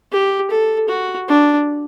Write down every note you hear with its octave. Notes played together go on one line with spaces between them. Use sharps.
G4
A4
F#4
D4